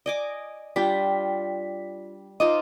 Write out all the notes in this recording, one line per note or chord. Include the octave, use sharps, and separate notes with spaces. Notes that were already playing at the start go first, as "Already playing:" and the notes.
D5 D#5 G#5 D6
G3 D4 F4 G5 B6
D#4 F4 C5 D#5 D6